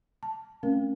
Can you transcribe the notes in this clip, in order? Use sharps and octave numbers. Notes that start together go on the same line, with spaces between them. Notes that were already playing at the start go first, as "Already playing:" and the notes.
A5
A3 C4 C#4 A#4